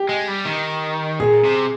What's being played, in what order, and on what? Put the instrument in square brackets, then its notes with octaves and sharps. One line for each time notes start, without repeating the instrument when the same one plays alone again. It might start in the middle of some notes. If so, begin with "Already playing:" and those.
Already playing: [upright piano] G4
[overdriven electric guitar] G#3
G3
D#3
[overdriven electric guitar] A#2 [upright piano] G#4
[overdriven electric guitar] C3